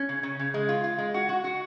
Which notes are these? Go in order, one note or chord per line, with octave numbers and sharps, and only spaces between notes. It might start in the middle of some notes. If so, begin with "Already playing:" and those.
Already playing: C#4
C#3
C#3
C#3
G#3
F4
F4
G#3
F#4
F#4
F#4